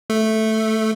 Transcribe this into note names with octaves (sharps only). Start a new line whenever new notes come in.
A3